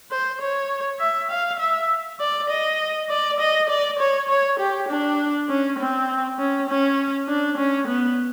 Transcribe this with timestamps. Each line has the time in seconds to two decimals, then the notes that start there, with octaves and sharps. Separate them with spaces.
0.11 C5
0.41 C#5
1.00 E5
1.30 F5
1.60 E5
2.20 D5
2.50 D#5
3.10 D5
3.39 D#5
3.69 D5
3.99 C#5
4.28 C#5
4.59 G4
4.88 D4
5.49 C#4
5.79 C4
6.39 C#4
6.69 C#4
7.28 D4
7.58 C#4
7.87 B3